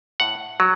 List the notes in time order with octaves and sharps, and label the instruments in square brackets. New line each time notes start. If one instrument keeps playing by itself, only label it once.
[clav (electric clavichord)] A2 F#5
F#3